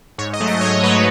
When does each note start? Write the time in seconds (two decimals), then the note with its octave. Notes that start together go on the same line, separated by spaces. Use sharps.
0.18 G#2 C#5
0.33 D#5
0.40 F#3 A3
0.48 D#5
0.61 G#2 C#5
0.83 F#3 A3 B4